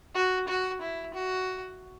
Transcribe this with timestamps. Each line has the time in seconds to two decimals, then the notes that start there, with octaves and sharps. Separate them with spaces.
0.15 F#4
0.48 F#4
0.81 E4
1.14 F#4